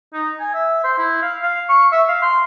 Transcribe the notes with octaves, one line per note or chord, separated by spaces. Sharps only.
D#4
G#5
E5
C5
E4
F5
F5
C#6
E5
F5
C6